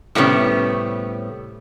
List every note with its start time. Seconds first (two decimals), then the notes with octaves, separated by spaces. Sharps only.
0.15 A2 C3 G3 A3 B3 C#4